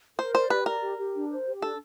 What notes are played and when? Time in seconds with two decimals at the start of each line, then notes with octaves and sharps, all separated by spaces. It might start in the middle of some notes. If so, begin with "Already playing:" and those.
0.19 A#4 C5
0.34 C5 D5
0.50 G4 B4
0.66 A#4 D5
0.82 G4
0.98 G4
1.14 D4
1.30 C5
1.47 G4
1.62 D4 A4